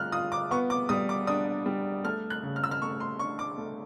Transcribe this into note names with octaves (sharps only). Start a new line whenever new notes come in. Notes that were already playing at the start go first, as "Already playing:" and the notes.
Already playing: G3 F4 F6 F#6
F4 D#6
D6
B3 C#6
D6
G3 D#6
D6
D4 D#6
G3
A3 F6
F#6
C#3
F6
E6
F6
A3 C#6
C6
D4 C#6
D6
A3